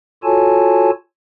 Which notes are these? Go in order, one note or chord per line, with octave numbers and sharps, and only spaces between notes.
F4 F#4 A4 C#5 G#5 A5